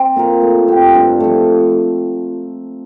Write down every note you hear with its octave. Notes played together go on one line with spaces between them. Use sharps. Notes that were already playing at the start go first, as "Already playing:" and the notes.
Already playing: C4
A#3 F4 A#4
A3
C4 G4
G2
F3 A3